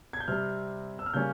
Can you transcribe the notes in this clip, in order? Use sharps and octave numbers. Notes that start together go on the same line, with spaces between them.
G#6
G6
C3 G3 C4 F6
E6
F6
C#3 G3 A#3 C#4 G6